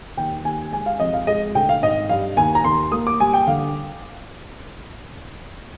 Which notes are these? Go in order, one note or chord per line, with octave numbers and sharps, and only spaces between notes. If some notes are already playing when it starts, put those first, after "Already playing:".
D#2 G5
D#2 G#5
G#3 G#5
F5
F2 D#5
F5
G#3 D#5
D2 G5
F5
G#1 D#5
G2 F5
D#2 G#5
A#5
D#2 C6
A#3 D#6
D6
G3 G#5
G5
D3 F5